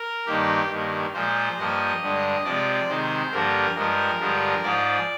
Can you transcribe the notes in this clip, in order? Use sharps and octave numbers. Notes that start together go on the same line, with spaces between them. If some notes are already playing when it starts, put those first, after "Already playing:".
Already playing: A#4
G2 D#3 A#3 G4
G2 D#3 A#3
A#2 F3 G#3 C5
G2 F3 A#3 D#5
G2 D3 G#3
C3 F3 G#3 D5
C3 D#3 G#3 C5
G2 D3 F3 A#3 A#4
G2 F3 G#3 A#4
G2 D3 F3 G#3
G#2 F3 G#3 D5